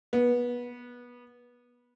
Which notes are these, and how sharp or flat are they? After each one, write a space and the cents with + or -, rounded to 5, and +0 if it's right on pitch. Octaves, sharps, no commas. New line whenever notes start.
B3 -20